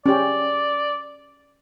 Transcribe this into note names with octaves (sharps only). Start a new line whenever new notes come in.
C#4 G4 D5